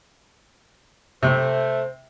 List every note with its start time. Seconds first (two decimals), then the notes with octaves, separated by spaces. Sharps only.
1.23 C3 A3 C5